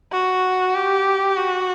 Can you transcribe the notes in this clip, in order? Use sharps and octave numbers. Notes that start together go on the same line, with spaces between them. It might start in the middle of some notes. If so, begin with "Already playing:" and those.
F#4
G4
F#4